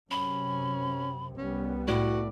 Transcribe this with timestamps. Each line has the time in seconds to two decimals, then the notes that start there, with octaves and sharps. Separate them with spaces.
0.11 F#2 C3 C#4 B5
1.37 C2 G3 B3 C#4
1.88 A2 E4 F#4 D5